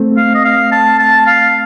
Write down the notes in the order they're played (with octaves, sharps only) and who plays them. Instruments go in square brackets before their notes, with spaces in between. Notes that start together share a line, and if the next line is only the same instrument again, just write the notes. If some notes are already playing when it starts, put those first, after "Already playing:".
Already playing: [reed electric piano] A3 C4
[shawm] F5
D#5
F5
A5
A5
F5